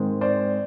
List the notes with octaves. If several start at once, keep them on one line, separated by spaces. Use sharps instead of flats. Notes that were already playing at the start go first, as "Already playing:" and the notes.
Already playing: G#2 D#3 G#3 C4
C5 D5